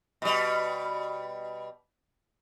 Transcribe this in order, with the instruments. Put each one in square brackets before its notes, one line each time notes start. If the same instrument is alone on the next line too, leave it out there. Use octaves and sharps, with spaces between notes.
[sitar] B2 G3